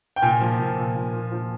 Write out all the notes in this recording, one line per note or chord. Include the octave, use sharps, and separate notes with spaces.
G5
A#2 G#5
F3
A#2
A#2
A#2
A#2
F3